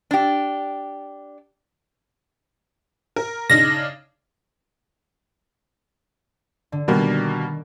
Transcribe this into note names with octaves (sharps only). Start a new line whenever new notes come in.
D4 G4
A#4
C#3 D4 D#4 A#6
D3
B2 D#3 G3 A#3